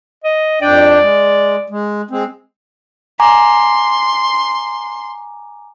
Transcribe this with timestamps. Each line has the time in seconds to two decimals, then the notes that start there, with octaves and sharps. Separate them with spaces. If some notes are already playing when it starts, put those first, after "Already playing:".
0.24 D#5
0.62 F2 D4 D5 G5
1.01 G#3
1.70 G#3
2.11 G#3 C4
3.20 G#5 A#5 C6 D6